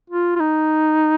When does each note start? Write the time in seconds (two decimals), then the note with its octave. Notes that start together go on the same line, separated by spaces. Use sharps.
0.10 F4
0.36 F4
0.40 D#4